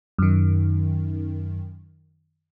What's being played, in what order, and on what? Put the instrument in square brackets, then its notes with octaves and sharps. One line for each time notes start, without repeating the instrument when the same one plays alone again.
[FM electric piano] F#2 D#3